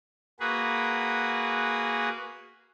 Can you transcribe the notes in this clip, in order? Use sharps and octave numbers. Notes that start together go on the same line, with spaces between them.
A#3 F#4 G#4 B4